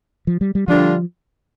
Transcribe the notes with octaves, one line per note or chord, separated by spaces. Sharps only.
F3
G3
G3
D3 F3 G3 D4 F4